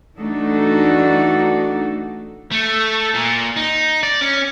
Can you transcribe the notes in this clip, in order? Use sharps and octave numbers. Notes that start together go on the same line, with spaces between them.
E3 A3 D4 D#4 F#4 A4
A3
A#2
D#4
D5
C#4